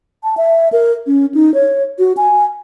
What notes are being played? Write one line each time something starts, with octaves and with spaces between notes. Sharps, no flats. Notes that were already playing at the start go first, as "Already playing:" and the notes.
A5
E5
A#4
C#4
D#4
C#5
F#4
G#5